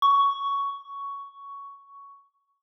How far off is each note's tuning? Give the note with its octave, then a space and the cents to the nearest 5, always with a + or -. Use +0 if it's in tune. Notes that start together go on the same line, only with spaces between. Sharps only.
C#6 +10